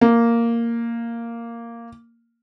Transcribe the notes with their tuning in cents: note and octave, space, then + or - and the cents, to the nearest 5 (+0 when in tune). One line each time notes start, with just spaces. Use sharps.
A#3 -5